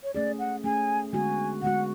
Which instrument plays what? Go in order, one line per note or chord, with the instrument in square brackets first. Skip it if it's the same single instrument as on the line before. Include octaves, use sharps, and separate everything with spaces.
[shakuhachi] C#5
[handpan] A3 C#4 G#4 [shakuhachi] D5
[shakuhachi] F#5
[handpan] A3 C#4 G#4 [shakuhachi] G#5
[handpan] D3 G#3 B3 F#4 [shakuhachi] G#5
[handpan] D3 G#3 B3 F#4 [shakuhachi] F#5